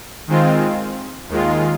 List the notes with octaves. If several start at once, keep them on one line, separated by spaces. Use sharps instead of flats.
D#3 G#3 C4 F4
D#2 D#3 G#3 F4